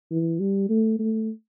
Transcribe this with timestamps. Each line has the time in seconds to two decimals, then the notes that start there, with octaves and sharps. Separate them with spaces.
0.11 E3
0.40 G3
0.69 A3
0.99 A3